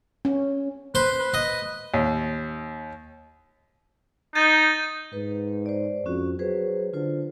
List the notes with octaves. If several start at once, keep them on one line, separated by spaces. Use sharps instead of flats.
C#4
B4 C5
B4
D#5
D#2
D#4 G6 A6 D#7
G#2 B4
C5 D5
F2 C#4 F#4
F#3 G#4 B4 C5
D3 F4 A4 C5